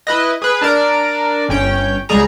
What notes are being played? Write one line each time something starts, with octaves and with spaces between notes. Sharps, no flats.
E4 B4 D#5
G#4 B4
D4 A#4 D5
G1 C#4 G5
C#2 G3 G#4 A#5